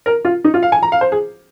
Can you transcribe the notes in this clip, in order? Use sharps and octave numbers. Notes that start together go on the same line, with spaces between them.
A#4
F4
D#4
F4
F5
G#5
A#5
F5
C5
G#4